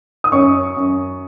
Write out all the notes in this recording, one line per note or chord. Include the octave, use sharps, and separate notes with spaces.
D#6
F#2 C#5 C#6
F#2